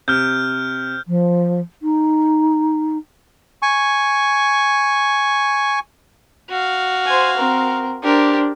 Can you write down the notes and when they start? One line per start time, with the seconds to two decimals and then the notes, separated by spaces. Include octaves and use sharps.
0.08 C3 F6 G6
1.07 F3
1.82 D#4
3.62 G#5 C#6
6.49 F#4 F5
7.06 C5 G#5
7.37 C4 A#4
8.02 D4 G4 A#4 C5